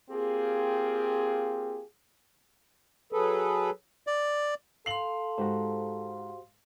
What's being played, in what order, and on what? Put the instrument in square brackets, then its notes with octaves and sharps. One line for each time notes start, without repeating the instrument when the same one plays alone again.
[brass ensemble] A#3 C4 F4 G4 G#4
[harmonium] F#3 G#4 A4 B4
[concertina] D5
[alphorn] A4 [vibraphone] F5 C6 [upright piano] C7 F#7
[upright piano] G#2 [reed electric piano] F#4 G4 C5